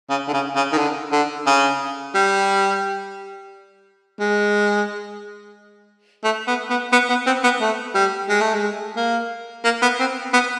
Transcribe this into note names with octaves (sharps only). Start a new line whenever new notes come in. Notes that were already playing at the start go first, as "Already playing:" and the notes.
C#3
D3
C#3
C#3
D#3
D3
D3
C#3
G3
G#3
A3
B3
B3
B3
B3
C4
B3
A3
G3
G#3
A3
G#3
A#3
A#3
B3
C4
B3